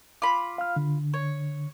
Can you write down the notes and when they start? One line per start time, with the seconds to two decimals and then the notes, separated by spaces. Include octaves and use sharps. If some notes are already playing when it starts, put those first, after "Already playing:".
0.22 F4 B5 D6
0.58 F5 F6
0.76 D3
1.14 C#5